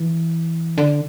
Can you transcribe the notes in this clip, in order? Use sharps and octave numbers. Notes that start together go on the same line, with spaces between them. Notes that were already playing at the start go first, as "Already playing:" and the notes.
Already playing: E3
D3